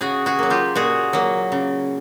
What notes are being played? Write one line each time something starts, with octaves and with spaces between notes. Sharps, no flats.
C#3 F#4 G#4
F#4 G#4
F#3 A#3
F4 G4
A#2 F#4 G#4
F#3 A#3
C#3